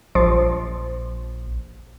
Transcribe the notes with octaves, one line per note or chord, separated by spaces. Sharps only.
A#1 F3